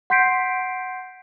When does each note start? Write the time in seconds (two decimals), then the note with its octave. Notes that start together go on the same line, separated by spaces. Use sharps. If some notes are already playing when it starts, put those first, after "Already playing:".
0.10 F#5 C6 G6 B6 C7 D7